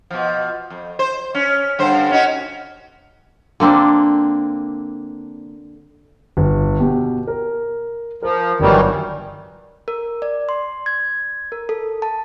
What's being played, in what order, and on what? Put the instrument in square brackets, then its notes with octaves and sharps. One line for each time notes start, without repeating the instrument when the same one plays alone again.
[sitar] B2 F3
F2
C5
C#4
G2 D3 C5
C#4 D#4 F#4
[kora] D3 A#3 C4 D4
[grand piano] G1
B2 G4
A#4
[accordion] F3 [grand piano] A#4
[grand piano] G1 F#3 [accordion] D#3 E3 G3
[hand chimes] A#4
D5
C6
G#6
A#4
A4
A5